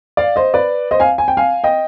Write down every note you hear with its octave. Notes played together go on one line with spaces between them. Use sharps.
D5 F5
C5 D#5
B4 D5
C5 D#5
F5 G#5
G#5
G5
F5 G#5
D#5 G5